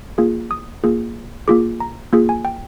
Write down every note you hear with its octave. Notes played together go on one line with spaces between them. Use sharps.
A#3 F4 G#4
D#6
A#3 F4 G#4
A#3 F4 G#4 D6
A#5
A#3 F4 G#4
G#5
G5